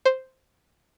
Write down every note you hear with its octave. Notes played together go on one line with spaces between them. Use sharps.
C5